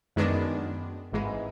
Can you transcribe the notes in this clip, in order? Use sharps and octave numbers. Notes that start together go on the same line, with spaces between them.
F#2 D#3 G#3 B3 D4
G#1 G#2 E3 G#3